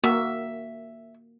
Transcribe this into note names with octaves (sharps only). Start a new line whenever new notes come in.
A#3 F#4 E5